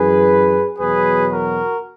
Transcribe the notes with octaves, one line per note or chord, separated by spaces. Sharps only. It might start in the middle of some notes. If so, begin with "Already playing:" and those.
Already playing: F#2 E3 G#4 B4
E2 B2 F#3 G#4 B4
F#4 A#4